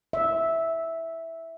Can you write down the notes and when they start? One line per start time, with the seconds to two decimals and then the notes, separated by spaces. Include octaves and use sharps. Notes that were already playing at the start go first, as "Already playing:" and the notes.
0.13 E5